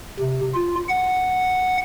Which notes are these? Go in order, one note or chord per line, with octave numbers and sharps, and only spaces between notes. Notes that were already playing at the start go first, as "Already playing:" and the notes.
C3
F4
F#5